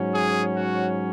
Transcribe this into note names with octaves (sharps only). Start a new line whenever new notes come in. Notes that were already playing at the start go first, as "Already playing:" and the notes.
Already playing: G#2 F#3 C#4
G#4
F#4